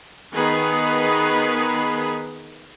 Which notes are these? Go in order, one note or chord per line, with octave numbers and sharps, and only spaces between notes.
D#3 B3 D#4 G#4 B4 B5